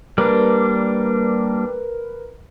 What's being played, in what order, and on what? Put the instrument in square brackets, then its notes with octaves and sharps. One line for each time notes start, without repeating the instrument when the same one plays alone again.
[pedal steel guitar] G3 A#3 D4 [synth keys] A#4 B4